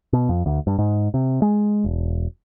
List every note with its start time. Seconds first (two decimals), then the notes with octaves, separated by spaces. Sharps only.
0.13 B2
0.29 F2
0.46 D2
0.67 G2
0.78 G#2
1.14 C3
1.42 G#3
1.84 E1